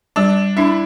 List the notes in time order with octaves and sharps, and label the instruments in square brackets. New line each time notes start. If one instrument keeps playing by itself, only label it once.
[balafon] G3 [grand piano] D4
[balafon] D4 [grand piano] E4